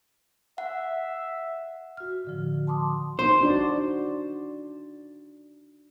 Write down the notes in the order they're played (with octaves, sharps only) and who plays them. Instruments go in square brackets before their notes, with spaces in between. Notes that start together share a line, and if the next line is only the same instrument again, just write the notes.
[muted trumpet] E5 [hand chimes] F#5
[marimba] F#4 F6
A2 D3 F3
F#5 A5 C6 D6 D#6
[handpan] D#4 [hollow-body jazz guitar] C5
[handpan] D4 F#4 D5